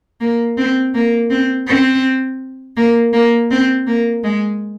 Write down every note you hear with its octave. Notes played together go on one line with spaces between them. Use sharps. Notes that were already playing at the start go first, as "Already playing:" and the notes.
A#3
C4
A#3
C4
C4
A#3
A#3
C4
A#3
G#3